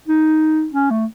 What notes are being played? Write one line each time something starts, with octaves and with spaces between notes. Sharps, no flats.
D#4
C#4
A3